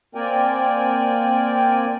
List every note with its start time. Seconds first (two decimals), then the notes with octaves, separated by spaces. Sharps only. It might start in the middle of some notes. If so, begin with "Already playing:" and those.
0.15 A#3 C4 A#4 D5 G5 G#5